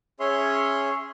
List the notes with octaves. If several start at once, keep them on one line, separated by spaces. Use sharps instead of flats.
C#4 G#4 C#5 E5 C6